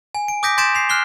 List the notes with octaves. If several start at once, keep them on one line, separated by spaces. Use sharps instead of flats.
G#5
D7
D6 D#6 G6 A#6 B6 D7
C6 G6 A6 B6 D7 E7
C7 F7
F6 F#6 C7 G7